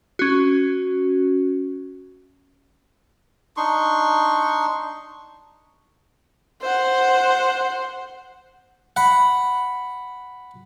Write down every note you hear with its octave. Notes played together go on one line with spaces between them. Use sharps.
C#4 F#4
D4 D#4 C6 C#6
C5 F#5
F#5 B5